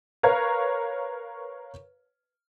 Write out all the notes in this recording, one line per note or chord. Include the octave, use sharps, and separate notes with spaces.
A#4 B4 C#5 F5 C#6